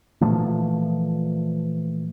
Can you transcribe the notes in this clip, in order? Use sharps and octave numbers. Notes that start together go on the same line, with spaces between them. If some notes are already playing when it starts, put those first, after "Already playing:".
A#2 E3 F3 A3